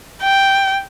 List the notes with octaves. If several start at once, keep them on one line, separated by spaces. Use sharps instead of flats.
G5